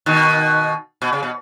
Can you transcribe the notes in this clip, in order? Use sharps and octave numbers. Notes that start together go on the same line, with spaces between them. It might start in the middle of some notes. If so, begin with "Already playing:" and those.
B2 D#3
B2
C#3
B2